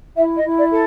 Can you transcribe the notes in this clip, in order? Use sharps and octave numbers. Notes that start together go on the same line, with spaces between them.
E4 E5
D#5
E4
D5
A4